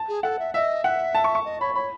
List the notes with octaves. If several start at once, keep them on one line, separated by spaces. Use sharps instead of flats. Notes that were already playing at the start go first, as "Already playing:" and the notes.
Already playing: A5
G#4
A4 F#5
E5
D#5 E5
E5 F#5
A5
C#6
C#6
D#5
C#5 B5
C#5 B5